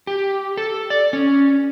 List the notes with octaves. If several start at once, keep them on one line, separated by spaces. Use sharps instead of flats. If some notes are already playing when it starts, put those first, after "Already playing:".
G4
A4
D5
C#4